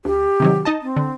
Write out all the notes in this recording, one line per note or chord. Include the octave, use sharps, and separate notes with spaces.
D2 G4
C3 D#3 F#3
D#4 D#5 A5
C4
D3